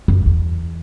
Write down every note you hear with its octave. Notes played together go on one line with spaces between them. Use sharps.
F#2
E2